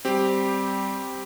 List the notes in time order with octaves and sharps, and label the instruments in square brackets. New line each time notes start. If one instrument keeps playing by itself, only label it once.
[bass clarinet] G3 [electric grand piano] C4 G4